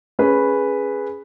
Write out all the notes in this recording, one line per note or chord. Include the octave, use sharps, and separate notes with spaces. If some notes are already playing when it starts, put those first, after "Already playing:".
C#4 G#4 B4